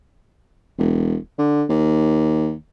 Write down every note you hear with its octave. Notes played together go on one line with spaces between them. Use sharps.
E1
D3
D#2